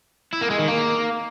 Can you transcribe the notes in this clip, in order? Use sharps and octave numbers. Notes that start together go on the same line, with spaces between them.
E4
A#3
G#3
D#3
A#3